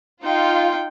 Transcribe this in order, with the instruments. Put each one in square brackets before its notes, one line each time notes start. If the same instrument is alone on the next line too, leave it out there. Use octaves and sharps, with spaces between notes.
[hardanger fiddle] D#4 G5 [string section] F4